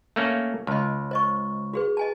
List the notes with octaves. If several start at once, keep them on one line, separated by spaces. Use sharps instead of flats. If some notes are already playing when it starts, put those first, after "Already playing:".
A3 A#3 C#4
C#2 D#5 A5
C5 D#5 C#6
F#4 G#4 B4
D#5 G#5 A5